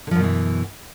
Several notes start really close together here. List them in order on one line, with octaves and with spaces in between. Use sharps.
D3 F3 F#2 B2 E3